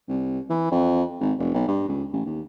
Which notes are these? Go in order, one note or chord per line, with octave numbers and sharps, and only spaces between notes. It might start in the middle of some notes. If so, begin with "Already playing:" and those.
C2
E3
F2
G#1
F1
B1
G2
C#2
A1
D#2